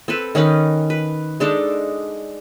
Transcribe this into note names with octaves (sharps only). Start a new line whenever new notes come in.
C4 A4 B4
D#3 C#4 D#4 B4
B4
G#3 D4 D#4 A4